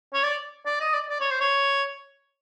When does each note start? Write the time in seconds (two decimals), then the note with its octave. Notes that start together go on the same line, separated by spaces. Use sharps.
0.14 C#5
0.23 D5
0.66 D5
0.80 D#5
0.94 D5
1.09 D5
1.20 C#5
1.31 C5
1.41 C#5